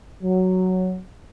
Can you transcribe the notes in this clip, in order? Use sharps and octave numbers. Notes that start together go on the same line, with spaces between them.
F#3